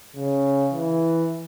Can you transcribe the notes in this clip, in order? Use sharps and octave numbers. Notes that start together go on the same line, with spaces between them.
C#3
E3